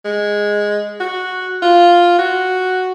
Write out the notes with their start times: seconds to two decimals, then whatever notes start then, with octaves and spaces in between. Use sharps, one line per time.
0.05 G#3
1.00 F#4
1.62 F4
2.19 F#4